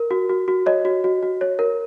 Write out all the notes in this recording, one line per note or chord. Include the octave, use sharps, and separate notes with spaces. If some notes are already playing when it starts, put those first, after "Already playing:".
Already playing: A#4
F#4
F#4
F#4
C#5 D#5
F#4
F#4
F#4
C#5
A#4